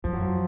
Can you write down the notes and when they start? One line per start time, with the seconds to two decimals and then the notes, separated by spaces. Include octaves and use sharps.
0.04 F#2 F3
0.13 F#3
0.22 F3